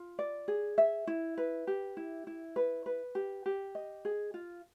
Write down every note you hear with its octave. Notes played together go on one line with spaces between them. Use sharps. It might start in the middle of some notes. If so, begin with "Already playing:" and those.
Already playing: F4
D5
G#4
E5
E4
B4
G4
E4
E4
B4
B4
G4
G4
D#5
G#4
F4